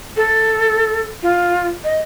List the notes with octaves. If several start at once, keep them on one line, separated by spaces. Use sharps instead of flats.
A4
F4
D#5